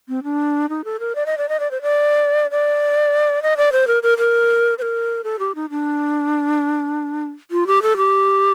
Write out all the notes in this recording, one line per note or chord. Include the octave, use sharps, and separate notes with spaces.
C4
D4
D#4
A4
A#4
D5
D#5
D5
D#5
D5
C5
D5
D5
D#5
D5
C5
A#4
A#4
A#4
C5
A#4
A4
G4
D#4
D4
F4
G4
A4
G4